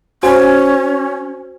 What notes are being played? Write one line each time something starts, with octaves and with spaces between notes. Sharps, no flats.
C#4 F#4 C5 G#5